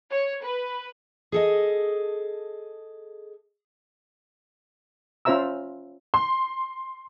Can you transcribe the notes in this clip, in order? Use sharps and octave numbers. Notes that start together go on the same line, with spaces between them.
C#5
B4
G#4 A4 D#5
C#4 F4 C5 E5 A#5 E6
C6